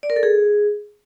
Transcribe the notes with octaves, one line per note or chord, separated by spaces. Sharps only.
D5
A#4
A4
G#4